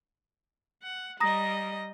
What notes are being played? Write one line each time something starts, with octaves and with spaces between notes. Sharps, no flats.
F#5
G3 D#5 A#5 D#6 A#6